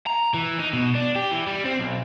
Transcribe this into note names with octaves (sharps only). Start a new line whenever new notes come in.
A#5
E3
D#4
B2
D4
G4
E3
G3
C4
B1